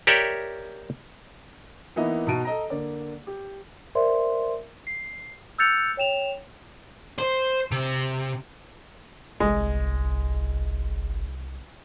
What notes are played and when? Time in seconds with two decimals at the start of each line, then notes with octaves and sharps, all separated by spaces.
0.07 G4 A#4 C#5 D5 E5 G5
1.96 E3 A#3 B3 D#4 E4 D#5
2.27 B2 D#4 F#4 A5 D7 D#7
2.45 A4 D#5 A#5
2.70 D3 A#3 D5
3.27 G4
3.95 A#4 C5 D5 E5 C6
4.87 C7
5.58 E6 F#6 G6 A6 C#7 F7
5.97 C#5 G5 E7 F7
7.19 C5
7.71 C3
9.40 G1 C2 G#3